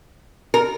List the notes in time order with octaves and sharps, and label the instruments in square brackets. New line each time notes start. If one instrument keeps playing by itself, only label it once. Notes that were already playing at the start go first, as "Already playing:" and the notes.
[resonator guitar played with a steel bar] A#4